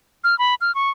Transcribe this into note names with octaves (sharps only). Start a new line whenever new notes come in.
F6
B5
F6
C#6